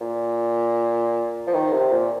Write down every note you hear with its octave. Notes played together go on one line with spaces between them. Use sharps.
A#2
F3
D#3
C3
A#2